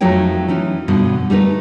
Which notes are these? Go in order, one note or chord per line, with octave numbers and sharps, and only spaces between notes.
F2 F#3 A3 D#4 C#5 G5
E3 C#4 D#4
G2 B2 D3
G3 A3 D#4 B4